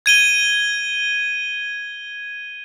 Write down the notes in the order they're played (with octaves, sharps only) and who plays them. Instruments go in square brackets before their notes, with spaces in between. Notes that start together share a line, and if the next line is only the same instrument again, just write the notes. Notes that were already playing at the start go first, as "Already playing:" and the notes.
[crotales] G#6 D#7 G7